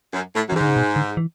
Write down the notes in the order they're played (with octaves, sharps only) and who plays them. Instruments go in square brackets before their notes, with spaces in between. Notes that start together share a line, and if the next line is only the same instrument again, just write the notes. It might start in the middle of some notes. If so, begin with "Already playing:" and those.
[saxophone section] F#2
A2
F#2
[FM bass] E3
[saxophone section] G#2
[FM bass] D3
C#3
B2
D3
E3